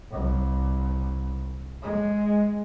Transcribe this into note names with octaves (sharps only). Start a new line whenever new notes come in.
C2
G#3